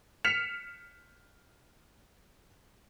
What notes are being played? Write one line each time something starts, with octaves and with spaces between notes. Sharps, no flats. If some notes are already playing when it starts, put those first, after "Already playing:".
F6 B6 C#7 E7 F7